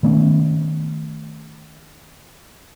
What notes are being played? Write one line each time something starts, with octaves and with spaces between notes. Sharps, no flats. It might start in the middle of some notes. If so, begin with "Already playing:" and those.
D#3 A3 B3 C#4